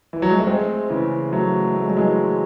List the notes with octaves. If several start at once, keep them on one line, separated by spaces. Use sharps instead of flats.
E3
F#3
G#3
A3
G#3 C4
C#3 E3
F#3 A3
A3
G#3
F#3
E3 G#3